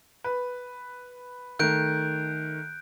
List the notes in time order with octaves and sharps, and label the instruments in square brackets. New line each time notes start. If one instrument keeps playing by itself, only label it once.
[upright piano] B4
[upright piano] D#3 A3 [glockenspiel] F#6 G6 D7